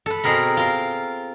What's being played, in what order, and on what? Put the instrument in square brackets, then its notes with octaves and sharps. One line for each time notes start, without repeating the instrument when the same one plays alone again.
[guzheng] A4 B4
B2 C4 G#4 A#4 B5
F4 A#4